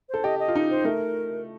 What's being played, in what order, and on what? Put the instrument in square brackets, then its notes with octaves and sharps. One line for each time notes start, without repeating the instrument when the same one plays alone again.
[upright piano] A4 [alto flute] C5
[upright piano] G4 [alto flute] D#5
[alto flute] D#5
[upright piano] F4
D#4
[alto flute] C5
[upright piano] A3 [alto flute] A#4